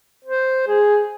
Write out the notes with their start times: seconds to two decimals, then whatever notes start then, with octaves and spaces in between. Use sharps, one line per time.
0.25 C5
0.67 G#4